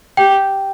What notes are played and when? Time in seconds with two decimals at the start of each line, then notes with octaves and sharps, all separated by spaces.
0.17 G4 G5